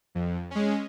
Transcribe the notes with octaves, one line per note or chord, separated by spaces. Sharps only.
F2
G#3 C#4